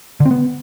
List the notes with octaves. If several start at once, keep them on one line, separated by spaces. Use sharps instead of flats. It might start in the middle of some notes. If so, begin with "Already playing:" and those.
D3
C4
B3